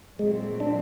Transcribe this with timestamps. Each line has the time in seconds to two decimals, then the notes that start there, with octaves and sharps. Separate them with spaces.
0.19 A#2 F#3 G#3 A3 C4
0.60 D4